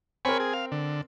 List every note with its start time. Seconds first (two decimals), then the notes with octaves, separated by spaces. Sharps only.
0.25 C4 A#4 C#5 G#5 B5
0.40 G#4
0.54 F5
0.72 D3